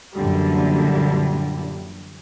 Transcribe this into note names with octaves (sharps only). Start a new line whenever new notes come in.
F#2 A#2 D3 E3 G3